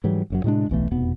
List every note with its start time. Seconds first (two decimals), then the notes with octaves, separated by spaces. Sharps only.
0.04 G#2 E3 F#3 G3
0.30 F#1 F#2 F#3
0.44 A2 C3 G#3 D4
0.69 D1 B1 E3 A3
0.91 F1 E2 B2 B3